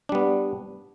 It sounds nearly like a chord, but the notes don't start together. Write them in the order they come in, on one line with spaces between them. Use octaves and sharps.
D4 G3 B3